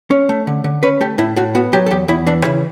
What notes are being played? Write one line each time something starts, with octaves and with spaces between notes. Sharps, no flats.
C#4
A3
D3
D3
C#4 B4
A3 G4
A2 E4
A2 F#4
B3 F#4
F#3 G4
A4
E2 G4
E2 E4
E3 D4
C#3 E4